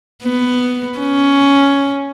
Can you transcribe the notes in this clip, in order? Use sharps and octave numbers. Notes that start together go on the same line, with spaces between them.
B3
C#4